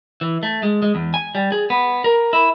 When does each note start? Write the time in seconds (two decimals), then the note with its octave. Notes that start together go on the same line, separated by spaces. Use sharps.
0.21 E3
0.43 A3
0.63 G#3
0.82 G#3
0.95 E2
1.14 G#5
1.35 G3
1.52 G#4
1.70 B3
2.04 A#4
2.33 E4